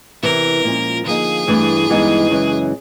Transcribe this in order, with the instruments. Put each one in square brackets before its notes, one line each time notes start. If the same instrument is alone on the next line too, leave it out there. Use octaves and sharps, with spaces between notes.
[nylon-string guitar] E2 C3 E3 [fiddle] A#4
[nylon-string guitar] A#2 F3 G#3 C#4
[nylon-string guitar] D3 F3 A#3 D#4 [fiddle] G#4
[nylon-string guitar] G2 E3 A3 D4
G2 E3 G#3 B3 D#4
F#2 C#3 E3 G#3